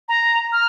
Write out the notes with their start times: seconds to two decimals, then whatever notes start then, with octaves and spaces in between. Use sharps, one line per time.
0.09 A#5
0.53 F6